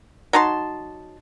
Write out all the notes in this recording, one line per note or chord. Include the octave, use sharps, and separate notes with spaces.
F#3 D#4 A5 C6